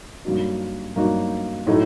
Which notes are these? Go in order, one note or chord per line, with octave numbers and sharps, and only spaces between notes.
G2 F#3 A#3 D#4 F#4
G2 F#3 A#3 D#4 F#4
A2 F#3 A3 D#4